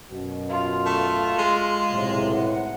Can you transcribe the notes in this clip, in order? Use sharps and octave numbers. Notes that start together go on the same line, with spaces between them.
F#2 B2
F4
A3
G#3 C6
B1 A2 C3
F#5